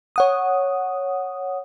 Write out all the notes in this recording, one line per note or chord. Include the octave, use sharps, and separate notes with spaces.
C#5 F#5 D#6